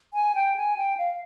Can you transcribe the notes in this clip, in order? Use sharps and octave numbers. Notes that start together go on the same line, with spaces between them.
G#5
G5
G#5
G5
F5